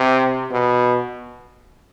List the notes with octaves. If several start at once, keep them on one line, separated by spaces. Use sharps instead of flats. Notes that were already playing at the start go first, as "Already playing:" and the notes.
Already playing: C3
B2